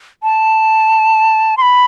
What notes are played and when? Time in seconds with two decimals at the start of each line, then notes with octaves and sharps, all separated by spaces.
0.23 A5
1.57 C6
1.62 B5